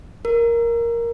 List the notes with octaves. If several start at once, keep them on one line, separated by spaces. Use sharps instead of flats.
A#4